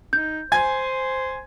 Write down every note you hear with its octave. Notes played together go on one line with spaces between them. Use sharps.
D#4 G6
C5 G#5 G#6